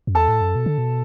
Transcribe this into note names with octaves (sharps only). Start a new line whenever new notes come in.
F#2
E2 A4 A5
A2
F#2
B2
D3
B2